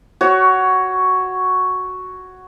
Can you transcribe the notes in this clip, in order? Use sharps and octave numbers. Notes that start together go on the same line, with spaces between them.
F#4 C#5